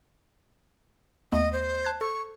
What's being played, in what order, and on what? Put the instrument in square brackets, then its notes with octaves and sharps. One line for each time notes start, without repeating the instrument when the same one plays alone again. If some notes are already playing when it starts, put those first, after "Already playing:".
[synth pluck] D#2 A3 B3 [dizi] D#5
[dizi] C5
[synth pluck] A5 F#6 G#6
[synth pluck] A4 [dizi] C#6